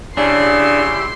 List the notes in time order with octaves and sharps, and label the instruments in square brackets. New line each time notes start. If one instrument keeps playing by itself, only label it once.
[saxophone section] C#3 [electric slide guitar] D4 [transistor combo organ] E4 G4 [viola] C6